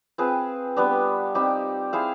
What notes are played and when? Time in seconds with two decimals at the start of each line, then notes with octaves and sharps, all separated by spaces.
0.18 C4 F4 G#4 B4
0.76 G3 B3 D4
1.35 G3 C4 D#4 G4
1.93 E4 G#4 C5 F5